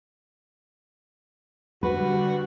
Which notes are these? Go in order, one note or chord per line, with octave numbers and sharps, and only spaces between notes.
D3 G3 F#4 B4